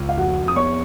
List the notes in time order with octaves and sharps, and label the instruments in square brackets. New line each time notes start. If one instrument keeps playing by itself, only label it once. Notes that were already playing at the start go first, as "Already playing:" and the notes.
Already playing: [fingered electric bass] C#2
[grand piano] F5
[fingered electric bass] F2 [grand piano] F#4 F#5
[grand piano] D#6
[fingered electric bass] B3 [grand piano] C#5 C#6